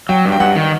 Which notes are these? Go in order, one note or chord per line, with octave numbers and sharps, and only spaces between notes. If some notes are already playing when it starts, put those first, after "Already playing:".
F#3 G5
G2
G5
G2 F#5
D#3